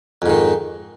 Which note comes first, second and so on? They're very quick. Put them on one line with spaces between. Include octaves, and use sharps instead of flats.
F2 G#2 D#3